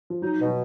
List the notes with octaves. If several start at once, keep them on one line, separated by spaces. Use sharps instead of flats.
F3
F#3 D#4
B2
F#3